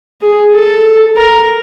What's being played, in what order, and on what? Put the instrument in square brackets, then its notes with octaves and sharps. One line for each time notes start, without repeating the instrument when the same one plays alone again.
[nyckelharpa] G#4
A4
A#4